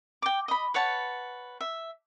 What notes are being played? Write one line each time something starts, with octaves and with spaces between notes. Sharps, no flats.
G5 D6
D#5 B5
B4 C#5 F#5 A5
E5